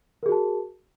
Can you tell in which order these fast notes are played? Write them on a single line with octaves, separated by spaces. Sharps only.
A#4 G#4 F#4 A5